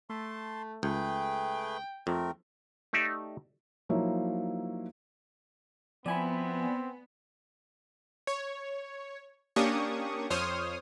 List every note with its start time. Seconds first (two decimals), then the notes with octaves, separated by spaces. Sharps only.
0.10 A3 A5 C6
0.83 C#2 A3 G#4 B4 G5
2.07 F2 A3 C4 A#4
2.93 A3 D#4 G4 D5 E5
3.89 F3 F#3 A#3 D#4 E4 C#5
6.06 F3 B3 C4 E4 D5 G#5 B5
8.27 C#5
9.56 A#3 C#4 D4 G4 C#6 D#6
10.30 F2 C5 C#5 D#6 F6